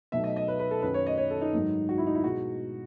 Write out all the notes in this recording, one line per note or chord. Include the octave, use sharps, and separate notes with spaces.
B2 F#3 A3 D#4 E5
D#5
D#5
B4
B4
A4
F#2 D#3 F#3 C#4 B4
C#5
D#5
C#5
A4
D#4
G#2 D#3 F#3
F#4
E4
D#4
E4
B2 G#3 D#4 F#4